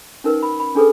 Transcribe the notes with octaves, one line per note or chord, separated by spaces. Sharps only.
C#4 D#4 A#4 B4
B5
B5
C#4 D4 G#4 A4 B4